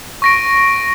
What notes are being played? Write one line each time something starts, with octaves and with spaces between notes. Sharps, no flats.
C#6 A#6 D7